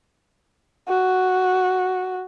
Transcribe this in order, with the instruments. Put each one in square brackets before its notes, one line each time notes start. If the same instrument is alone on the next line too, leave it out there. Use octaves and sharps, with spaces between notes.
[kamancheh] F#4